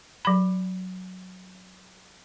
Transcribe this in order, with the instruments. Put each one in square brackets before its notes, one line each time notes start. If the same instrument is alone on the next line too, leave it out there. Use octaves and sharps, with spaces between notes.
[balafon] F#3 B5